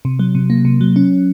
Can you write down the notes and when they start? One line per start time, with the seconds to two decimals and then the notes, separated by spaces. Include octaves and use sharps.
0.05 C3
0.19 F#3
0.35 C3
0.50 A#3
0.65 C3
0.81 F#3
0.96 C#4